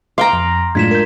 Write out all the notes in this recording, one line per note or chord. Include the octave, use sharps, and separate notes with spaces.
F5 G5 A#5 C6 D6
F2
F#2 A2 G#3 D4 F4 G#6 B6 E7
A#4 G6